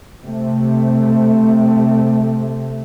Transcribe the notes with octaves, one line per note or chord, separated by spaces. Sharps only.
C3 A3